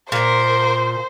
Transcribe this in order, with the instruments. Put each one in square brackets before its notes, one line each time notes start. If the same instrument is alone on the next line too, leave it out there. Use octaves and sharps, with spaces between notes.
[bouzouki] A#2 [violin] A#4 [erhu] C5